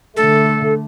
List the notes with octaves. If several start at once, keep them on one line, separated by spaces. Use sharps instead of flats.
D3 A3 A4